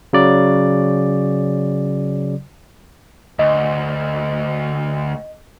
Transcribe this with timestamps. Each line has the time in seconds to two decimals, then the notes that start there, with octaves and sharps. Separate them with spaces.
0.13 C#3 F#3 D5
3.39 D2 D#5